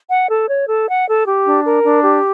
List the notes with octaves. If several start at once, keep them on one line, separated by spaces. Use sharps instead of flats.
F#5
A4
C#5
A4
F#5
A4
G4
D4
A#4
D4
G4